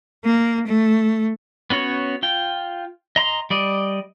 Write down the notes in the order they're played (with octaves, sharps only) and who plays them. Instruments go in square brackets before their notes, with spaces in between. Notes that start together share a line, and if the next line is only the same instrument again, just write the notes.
[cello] A#3
A3
[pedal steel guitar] B3 C#4 F#4 C#5
F4 G5
D#5 A#5 C6
G3 D5 D#5